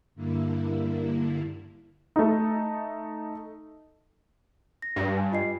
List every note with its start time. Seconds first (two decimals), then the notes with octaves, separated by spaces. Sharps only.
0.15 G2 D3 A#3 E4
2.16 A3 D#4
4.82 A#6
4.96 G2
5.17 G#5
5.32 F4 D#5 C7